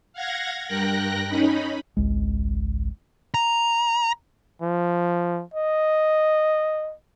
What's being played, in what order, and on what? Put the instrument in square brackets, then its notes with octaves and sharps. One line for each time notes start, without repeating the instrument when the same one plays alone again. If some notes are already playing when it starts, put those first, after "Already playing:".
[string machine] F5 F#5 G#6 A#6
G2 A#4 G5 F#6 A#6
C#4 D#4 B5
[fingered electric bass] G#1 C#2 G#3
[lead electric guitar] A#5
[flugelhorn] F3
D#5